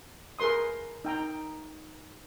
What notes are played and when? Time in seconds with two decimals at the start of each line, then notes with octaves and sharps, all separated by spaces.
0.39 G#4 A#4 B4 C6 D#6
1.05 D#4 G5 A#5